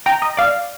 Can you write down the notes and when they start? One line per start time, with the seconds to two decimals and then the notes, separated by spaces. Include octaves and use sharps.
0.06 G5 A#5
0.22 D#5
0.37 D5 F5